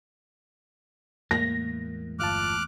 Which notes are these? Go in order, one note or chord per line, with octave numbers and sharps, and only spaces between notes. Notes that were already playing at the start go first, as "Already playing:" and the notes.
E2 A2 G#3 A#3 A#6
G1 F4 A5 D6 F6 F#6